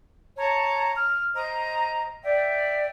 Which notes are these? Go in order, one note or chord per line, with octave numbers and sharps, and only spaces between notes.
C#5 A5 A#5
F6
C5 D#5 A#5
D5 E5 G5